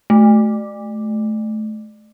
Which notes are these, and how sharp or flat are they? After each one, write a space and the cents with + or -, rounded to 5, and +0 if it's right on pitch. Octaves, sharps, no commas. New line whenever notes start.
A3 -25